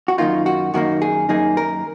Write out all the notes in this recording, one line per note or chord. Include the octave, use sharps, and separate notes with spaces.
F#4
F#2 D#3 A#3 D#4 F4
F#4
F#2 D#3 A#3 D#4 F#4
G#4
F#2 D#3 A#3 D#4 G#4
A#4